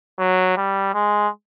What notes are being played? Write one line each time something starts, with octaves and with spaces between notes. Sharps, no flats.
F#3
G3
G#3